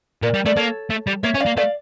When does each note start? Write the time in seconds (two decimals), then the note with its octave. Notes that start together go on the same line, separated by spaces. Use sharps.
0.23 A#2 A#4 D5
0.34 G3
0.46 A3 D5
0.56 A#3 A4 C#5
0.90 A3
1.07 G3
1.23 A#3 C#5 E5
1.34 C#4
1.40 D5 F5
1.46 A#3
1.57 A3 D5 F5